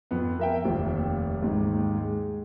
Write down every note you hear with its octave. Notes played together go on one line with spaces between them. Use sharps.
F2 B3
A#4 E5 G5
F1 D#2 C5
D#2 G#2
G#3